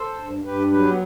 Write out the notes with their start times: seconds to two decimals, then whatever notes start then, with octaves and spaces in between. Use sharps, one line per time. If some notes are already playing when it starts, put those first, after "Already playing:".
Already playing: A4 C5
0.18 G2
0.44 G2 G4 B4
0.71 F#3 G4 B4
0.89 B3